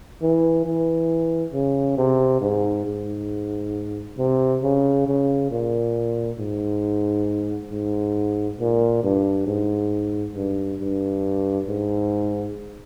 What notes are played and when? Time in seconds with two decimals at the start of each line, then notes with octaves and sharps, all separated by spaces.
0.22 E3
0.65 E3
1.53 C#3
1.98 C3
2.41 G#2
2.86 G#2
4.18 C3
4.63 C#3
5.07 C#3
5.51 A#2
6.38 G#2
7.71 G#2
8.60 A#2
9.03 G2
9.47 G#2
10.35 G2
10.81 G2
11.68 G#2